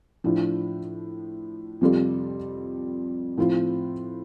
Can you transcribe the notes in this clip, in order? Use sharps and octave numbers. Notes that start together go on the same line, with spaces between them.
A2 F3 D4
F2 C3 G3 F4 A4
A2 F3 C4 F4